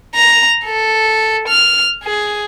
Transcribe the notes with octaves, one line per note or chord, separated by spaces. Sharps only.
A#5
A4
F6
G#4